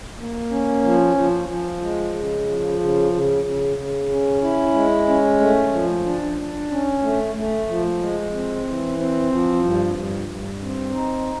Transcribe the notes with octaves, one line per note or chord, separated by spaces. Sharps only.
A#3
C#4
F3
F3
F3
G#3
C#3
F3
C#3
C#3
C#3
C#3
C#4
E4
G#3
C#4
A3
F3
D4
D4
C#4
A3
A3
F3
G#3
C4
E3
C4
F3
G2
G2
G2
C4
D#4